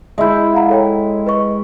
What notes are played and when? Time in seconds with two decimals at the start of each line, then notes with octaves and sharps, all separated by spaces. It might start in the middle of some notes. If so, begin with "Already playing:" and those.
0.18 G#3 E4 E5 G6
0.54 F5 F#5 A#5
0.69 A4 C#5 G5
1.26 B4 D#5 C#6